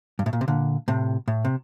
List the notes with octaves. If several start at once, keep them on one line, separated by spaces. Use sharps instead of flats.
G2
A2
A#2
C3
A#2 D3
A2 C3
A2
C3